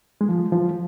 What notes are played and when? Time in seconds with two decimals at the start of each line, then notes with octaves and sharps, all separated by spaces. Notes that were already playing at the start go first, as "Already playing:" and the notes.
0.21 G#3
0.29 F3
0.52 F3